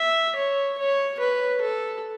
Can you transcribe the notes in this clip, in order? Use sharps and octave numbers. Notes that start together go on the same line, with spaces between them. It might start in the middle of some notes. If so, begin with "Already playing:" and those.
Already playing: E5
C#5
C#5
B4
A4